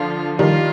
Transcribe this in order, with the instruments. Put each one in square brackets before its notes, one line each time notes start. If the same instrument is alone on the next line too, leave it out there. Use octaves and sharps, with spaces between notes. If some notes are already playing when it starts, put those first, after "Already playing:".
Already playing: [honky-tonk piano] D3 F3 [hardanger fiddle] F4
[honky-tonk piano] D#3 G3 [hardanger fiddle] F4